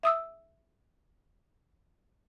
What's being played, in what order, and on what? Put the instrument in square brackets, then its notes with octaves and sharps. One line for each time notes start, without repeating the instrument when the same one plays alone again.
[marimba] E5 D#6 E6